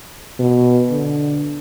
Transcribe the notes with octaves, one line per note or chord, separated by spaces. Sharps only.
B2
D3